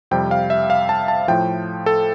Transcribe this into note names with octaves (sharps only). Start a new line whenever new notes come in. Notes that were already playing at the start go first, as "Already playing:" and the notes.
F2 C3 G3 G5
F5
E5
F5
A5
A5
A2 F3 G5
A4